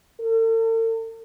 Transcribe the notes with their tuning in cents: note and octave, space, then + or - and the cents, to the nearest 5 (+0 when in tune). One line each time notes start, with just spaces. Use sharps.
A4 +45